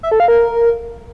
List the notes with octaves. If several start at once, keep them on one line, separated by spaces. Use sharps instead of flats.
E5
A4
F5
A#4